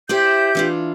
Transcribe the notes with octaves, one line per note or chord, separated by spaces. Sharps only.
E4 G4 C5 D5 G6
E3 D4 F4